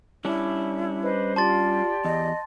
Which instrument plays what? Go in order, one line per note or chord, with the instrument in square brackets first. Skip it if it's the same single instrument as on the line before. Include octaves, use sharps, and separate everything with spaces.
[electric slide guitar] G3 C#4 D4 [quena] E4
[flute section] B4 C5 D#5
[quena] F4 [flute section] G4 D5 [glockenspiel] A5 C6 A6
[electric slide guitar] E2 [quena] D#5